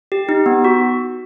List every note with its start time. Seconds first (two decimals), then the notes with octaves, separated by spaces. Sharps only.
0.12 G4
0.29 D#4
0.46 B3
0.64 F#4